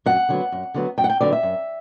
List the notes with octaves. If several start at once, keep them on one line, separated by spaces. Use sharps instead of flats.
F#2 F#5
D3 F#3 B3
F#2
D3 F#3 B3
F#2 G5
F#5
G5
D3 F#3 B3 D5
E5
F#2